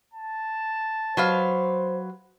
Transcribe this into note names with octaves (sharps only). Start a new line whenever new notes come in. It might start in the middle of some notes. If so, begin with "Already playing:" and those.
A5
F#3 B4 C5 F5